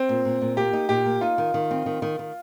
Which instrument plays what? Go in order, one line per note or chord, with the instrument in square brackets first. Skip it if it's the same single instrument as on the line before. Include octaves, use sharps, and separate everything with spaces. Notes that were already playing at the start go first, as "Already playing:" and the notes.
Already playing: [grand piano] C4
[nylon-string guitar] A#2
A#2
A#2
[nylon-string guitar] A#3 [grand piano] G4
[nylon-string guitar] D#4
[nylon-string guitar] A#2 [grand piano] G4
[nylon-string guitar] A#3
[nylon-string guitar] D#4 [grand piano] F4
[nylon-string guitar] D#3
D#3
C4
D#3
D#3
D#3